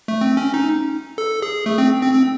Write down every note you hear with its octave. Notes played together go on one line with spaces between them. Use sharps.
A3
C4
C#4
D#4
A4
G#4
A3
C4
C4
C4